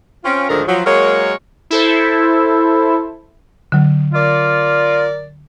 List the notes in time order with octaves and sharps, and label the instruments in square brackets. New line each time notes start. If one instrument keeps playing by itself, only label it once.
[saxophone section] C4 C#4 F4
D2 G#2 D3 D#3 F3 A#4
F3 F#3
F#3 G#3 A#3 A#4 C#5
[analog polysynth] E4 A4 C5
[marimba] D3 F#3
[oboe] F4 [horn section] A#4 D5